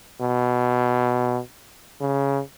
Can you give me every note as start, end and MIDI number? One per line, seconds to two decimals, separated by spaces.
0.22 1.40 47
2.01 2.40 49